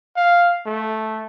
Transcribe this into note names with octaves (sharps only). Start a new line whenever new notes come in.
F5
A3